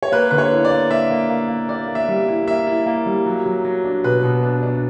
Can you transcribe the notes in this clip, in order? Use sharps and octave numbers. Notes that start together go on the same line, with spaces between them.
C#5
A#3 B4
D3 B4
C#5
E4
D5
A#3
A#3 E5
A#3
A#3
A#3
A#3 D5
A#3
E5
G3
E4
A#3 E5
E4
A#3
G3
F#3
F#3
F#3
D4
B2 B4
B2
D4
D4